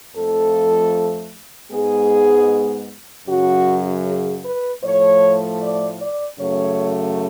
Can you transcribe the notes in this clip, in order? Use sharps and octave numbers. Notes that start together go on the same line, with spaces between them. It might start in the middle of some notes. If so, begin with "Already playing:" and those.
F2 F3 A3 A4
G#2 G#3 B3 G#4
F#2 C#3 F#3 F#4
G#4
B4
A2 F3 A3 C#5
D5
D5
F#2 C#3 F#3 A3 C#5